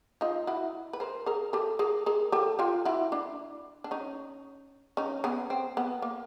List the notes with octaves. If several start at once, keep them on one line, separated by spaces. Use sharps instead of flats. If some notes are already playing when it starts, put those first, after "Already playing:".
D#4 F4
E4 F#4
B4
A#4 C5
G#4 A#4
G4 A4
G#4 A#4
G#4 A#4
G4 A4
F4 G4
E4 F#4
D4 E4
D4
C#4 D#4
C#4 D#4
B3 C#4
C4
B3
A#3